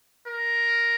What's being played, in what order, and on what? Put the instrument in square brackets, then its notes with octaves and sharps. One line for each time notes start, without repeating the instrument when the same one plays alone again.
[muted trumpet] A#4